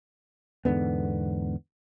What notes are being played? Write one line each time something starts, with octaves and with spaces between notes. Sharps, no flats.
E2 G#2 D3 B3